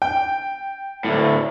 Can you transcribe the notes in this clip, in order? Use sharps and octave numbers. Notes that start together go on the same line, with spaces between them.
G5
D2 A2